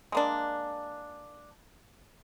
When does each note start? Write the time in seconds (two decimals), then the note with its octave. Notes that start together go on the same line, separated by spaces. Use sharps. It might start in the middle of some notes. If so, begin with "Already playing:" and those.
0.12 G#3 A#3 D4